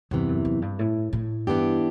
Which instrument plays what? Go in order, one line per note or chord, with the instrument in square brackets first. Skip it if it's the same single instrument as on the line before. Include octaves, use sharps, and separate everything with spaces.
[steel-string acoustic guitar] E2 C3 E3 [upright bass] G2
[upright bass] F#2
F#2
G2
A2
A2
[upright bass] G2 [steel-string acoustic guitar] E3 B3 D4 G4